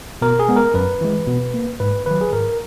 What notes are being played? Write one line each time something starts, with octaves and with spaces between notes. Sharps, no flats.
B2 A#4
G#4
G#3 B3
A#4
F#2 B4
E3 G#3
B2
A#3
G#2 B4
D#3 F#3 B4
G#4
G#2 A#4